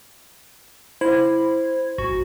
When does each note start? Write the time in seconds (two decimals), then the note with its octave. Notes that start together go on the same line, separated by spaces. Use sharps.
1.01 E4 C5
1.98 A1 F#4